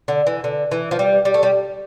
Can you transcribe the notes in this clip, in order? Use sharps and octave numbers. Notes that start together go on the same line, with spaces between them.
D3
E3
D3
E3
F3
G3
G3
A3
G3